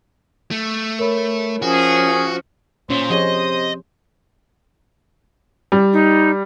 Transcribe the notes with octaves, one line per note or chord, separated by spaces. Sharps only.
A3
A#4 C#5 B5
F3 C#4 F#4 G#4
A#2 C#4 C5
C3 F3 G#4 C#5 D#5
G3
D#4